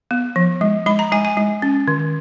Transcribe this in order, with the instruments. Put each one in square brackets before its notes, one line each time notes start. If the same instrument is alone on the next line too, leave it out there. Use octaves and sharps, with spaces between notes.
[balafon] B3
F3
G#3
G#3 B5
A#5
G#3 G#5
G#5
G#3
C#4
D#3